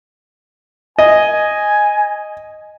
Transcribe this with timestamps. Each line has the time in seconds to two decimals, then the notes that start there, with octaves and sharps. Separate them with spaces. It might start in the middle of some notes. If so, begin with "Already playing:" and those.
0.99 D#5 G#5